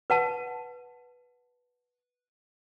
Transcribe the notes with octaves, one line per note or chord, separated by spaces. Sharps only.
B4 F#5 A5